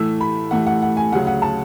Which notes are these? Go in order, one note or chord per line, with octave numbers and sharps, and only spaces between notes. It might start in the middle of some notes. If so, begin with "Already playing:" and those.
Already playing: A2 E3 A3 E6
B5
A2 E3 A3 F#5
F#5
F#5
G#5
D2 C#3 F#3 F#5
F#5
A5